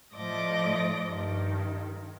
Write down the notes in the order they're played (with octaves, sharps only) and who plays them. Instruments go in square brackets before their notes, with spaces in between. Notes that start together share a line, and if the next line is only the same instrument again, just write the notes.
[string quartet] A2 F3 D5 D#5 D6 A#6
G2 D#3